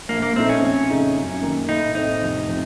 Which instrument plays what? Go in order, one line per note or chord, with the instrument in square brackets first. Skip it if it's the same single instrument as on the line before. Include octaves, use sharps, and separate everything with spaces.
[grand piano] A#1 [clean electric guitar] A#3
[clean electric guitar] A#3
[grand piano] A#2 A3 D#4 [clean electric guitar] C4
[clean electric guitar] C#4
[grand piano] F2
C#3 A3 D#4
F#2
D#3 A#3
[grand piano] A2 [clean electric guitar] D#4
[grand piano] A3 C4 [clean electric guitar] D#4
[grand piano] F1
C3 F3